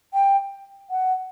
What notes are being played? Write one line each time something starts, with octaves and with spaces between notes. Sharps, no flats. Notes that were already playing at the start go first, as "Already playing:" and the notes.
G5
F#5